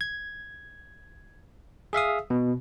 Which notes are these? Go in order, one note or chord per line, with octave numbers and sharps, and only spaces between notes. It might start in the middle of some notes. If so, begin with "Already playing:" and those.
G#6
G#4 E5 F5 D#6
B2